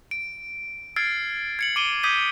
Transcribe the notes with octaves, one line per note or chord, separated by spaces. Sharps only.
D7
E6 F6 G#6 A6 C7 D7
G#6 C#7 F#7
D6 D7 D#7 G7
D6 D#6 G6 G#6 B6 D#7